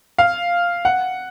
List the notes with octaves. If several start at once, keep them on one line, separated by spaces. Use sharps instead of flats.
F5
F#5